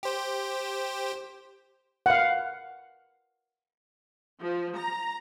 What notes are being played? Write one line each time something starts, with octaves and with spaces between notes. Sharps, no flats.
G4 C5
F5 F#5
F3
A#5